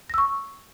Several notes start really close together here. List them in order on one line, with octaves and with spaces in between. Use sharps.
A#6 E6 C#6